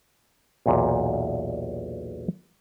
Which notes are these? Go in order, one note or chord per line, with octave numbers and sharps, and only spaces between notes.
B1 E2 A#2